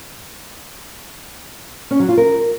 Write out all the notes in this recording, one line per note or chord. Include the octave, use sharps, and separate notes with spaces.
C#4
F#3
F4
A#4